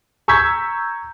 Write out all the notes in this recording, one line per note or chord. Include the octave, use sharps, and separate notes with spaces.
A#5 C#6 E6 G6 G#6 B6